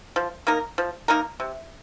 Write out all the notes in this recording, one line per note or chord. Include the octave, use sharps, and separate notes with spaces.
F3
A#3 D#4 A#4
F3
A#3 D#4 A#4
C3